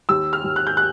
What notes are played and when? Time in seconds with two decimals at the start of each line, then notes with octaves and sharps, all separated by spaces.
0.09 D#2 E6
0.33 F6
0.44 D#2
0.56 F#6
0.67 G6
0.77 F#6